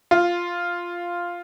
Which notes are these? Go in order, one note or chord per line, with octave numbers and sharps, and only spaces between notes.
F4